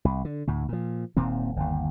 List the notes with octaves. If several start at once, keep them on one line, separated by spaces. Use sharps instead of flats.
C2
D3
D2 A2
A#2 F3
D#1 A#2 D#3 C4
G1 D#2